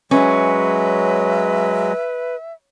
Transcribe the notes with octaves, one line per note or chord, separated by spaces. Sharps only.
F#3 G#3 C#4 B4 E5